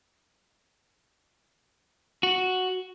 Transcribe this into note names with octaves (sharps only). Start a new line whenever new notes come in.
F#4